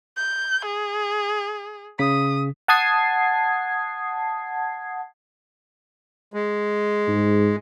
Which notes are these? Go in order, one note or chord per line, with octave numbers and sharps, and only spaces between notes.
G6
G#4
C#3 D#6 B6
F#5 A5 D#6 G#6 C7
G#3
G#2